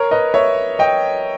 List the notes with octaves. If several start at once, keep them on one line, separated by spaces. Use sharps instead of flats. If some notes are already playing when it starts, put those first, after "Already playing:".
Already playing: A#4 C#5
B4 D#5
C#5 E5
D#5 G5